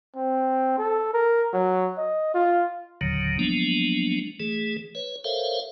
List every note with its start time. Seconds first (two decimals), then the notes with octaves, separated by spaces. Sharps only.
0.16 C4
0.78 A4
1.14 A#4
1.53 F#3
1.98 D#5
2.34 F4
3.01 F#1 D#2 A#2 D3 D#3 F#3
3.39 F3 F#3 G#3 A#3 B3 D4
4.40 E3 A3 G#4
4.95 B4 C#5
5.24 A4 A#4 C5 C#5 E5 F5